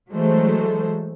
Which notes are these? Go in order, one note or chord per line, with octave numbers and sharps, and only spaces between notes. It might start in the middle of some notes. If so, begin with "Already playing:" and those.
E3 F#3 G#3 A3 A4 C5